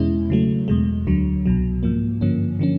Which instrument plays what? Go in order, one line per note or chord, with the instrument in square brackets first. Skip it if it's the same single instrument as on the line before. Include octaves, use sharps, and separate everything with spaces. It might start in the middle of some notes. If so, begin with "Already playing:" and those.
Already playing: [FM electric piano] E2 B2 G#3 C#4 E4
C#3 F#3 A3
E2 B2 G#3
D2 D3 F#3
C2 B2 F#3
G#2 F3 A#3
G2 D3 F3 A#3 C#4
D3 F3 A#3 C#4